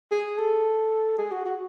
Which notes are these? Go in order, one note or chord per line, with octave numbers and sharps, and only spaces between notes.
G#4
A4
G#4
F#4
F#4